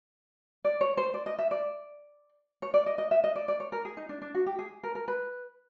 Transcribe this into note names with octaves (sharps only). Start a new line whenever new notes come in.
D5
C#5
C5
D5
D#5
E5
D5
C#5
D5
D#5
D#5
E5
D#5
D5
D5
C#5
A#4
G#4
D#4
D4
D4
F#4
G4
G#4
A#4
A#4
B4